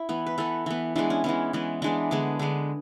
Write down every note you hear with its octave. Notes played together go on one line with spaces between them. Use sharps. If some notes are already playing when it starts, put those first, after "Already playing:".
Already playing: E4
E3 B3
B4
E3 B3 A4
E3 B3
E3 G#3 B3 D4
C#4
E3 G#3 B3 C#4
E3 G#3 B3
E3 G#3 B3 D4
D3 G#3 B3 G#4
D3 G#3 B3